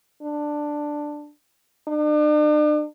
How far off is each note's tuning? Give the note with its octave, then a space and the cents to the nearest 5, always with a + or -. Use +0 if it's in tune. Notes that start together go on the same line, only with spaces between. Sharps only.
D4 +10
D4 +40